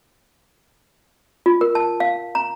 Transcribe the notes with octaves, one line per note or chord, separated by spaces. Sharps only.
F4
A#4
A5
F5
A#5